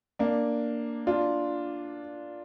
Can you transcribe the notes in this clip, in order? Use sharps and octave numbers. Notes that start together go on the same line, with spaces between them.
A#3 D4
D4 F4